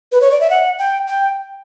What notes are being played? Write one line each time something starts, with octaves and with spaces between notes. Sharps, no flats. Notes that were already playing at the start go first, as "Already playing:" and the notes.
B4
C#5
D5
E5
F#5
G5
G5